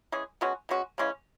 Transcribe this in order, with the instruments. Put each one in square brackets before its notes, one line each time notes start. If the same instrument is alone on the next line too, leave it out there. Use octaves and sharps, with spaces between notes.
[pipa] E3 G#3 C#4 G#4
B2 G#3 C#4 F#4
B2 G#3 C#4 F#4
C#3 E3 G#3 C#4